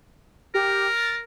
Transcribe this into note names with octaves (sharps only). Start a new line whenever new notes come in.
G4 A#4
A6